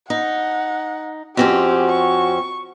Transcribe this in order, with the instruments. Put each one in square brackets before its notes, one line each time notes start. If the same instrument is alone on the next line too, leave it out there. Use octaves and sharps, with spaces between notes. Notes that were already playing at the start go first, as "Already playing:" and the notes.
[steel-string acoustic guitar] D#4 [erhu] F#5
[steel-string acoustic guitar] F2 C4 C#4 [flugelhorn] F#4 [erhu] G4
[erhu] C#6